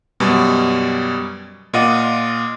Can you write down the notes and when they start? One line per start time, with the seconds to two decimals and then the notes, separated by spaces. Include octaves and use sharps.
0.20 F#2 B2 G3
1.73 A#2 F4 D#5 F#5 D6 D#7